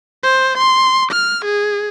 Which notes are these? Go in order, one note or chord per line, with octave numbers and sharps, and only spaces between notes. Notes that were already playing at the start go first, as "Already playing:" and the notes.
C5
C6
F6
G#4